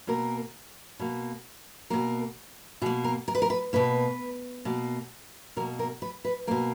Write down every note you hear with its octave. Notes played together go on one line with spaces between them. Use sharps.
B2 A#3 A#4
B2 A#3
B2 A#3 A#4
B2 A#3 G#4
A#4
A#4
B4
A#4
B4
B2 A#3 B4
B2 A#3
B2 A#3 A#4
A#4
B4
B4
B2 A#3 A#4